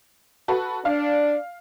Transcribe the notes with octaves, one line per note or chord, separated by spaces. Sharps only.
F#4 A4 B4
D4 F5